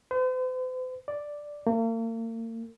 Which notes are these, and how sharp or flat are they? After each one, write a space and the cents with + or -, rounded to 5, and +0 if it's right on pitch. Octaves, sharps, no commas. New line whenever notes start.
C5 -45
D5 +0
A#3 -40